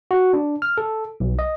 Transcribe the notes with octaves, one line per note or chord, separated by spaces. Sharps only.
F#4
D4
F6
A4
B1
D#5